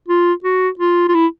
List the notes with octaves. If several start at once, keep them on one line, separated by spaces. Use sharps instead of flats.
F4
F#4
F4
F4
E4